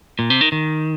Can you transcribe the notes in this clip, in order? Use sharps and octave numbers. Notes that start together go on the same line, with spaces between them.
A#2
C3
D#3
D#3